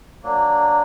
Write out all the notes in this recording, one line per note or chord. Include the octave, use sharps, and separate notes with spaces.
F#3 A#3 D4